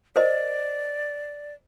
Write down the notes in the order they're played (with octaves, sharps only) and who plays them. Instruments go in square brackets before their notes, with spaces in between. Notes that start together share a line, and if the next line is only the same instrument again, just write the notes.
[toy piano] A#4 C5 D#5 [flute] D5